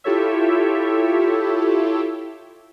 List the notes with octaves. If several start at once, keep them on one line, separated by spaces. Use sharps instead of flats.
E4 F4 G4 A4 C#5 E5